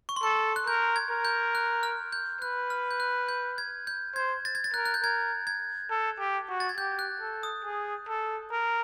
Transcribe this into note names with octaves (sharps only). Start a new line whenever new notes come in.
C#6
C6
A4 C#6
F#6
A#4 G6
G#6
A#4
G6
F#6
F6
G6
B4 F#6
F6
G6
F#6
G6
G#6
G6
C5 G#6
A6
G#6
A6
A#4 F#6
F#6
G6
A#4 G#6
G#6
A4
G4
F#4
A6
G#6
G4 G6
F#6
A4
D#6
G#4
A4
A#4